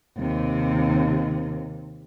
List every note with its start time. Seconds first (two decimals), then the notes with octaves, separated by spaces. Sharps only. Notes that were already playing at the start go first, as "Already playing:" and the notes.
0.17 D#2 C3